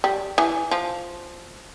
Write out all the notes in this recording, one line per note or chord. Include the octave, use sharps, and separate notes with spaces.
G3
E3
F3